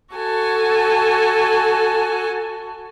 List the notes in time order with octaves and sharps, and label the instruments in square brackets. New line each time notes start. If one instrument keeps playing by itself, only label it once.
[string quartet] F#4 A4 G#5